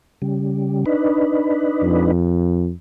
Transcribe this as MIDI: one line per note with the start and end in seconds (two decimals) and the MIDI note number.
0.22 0.85 49
0.22 0.85 55
0.86 2.12 62
0.86 2.12 63
0.86 2.12 71
1.83 2.72 41